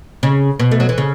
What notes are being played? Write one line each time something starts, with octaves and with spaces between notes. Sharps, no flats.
C#3
B2
A3
F#3
E3
C#3